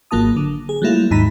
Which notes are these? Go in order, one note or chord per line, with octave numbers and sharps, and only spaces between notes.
G#1 F#3 A#3 F4 A5 D#6
D3
G#4
F#3 G3 A3 A#3 E4 F4
D#2 G#2 D#4 A#5 B5 B6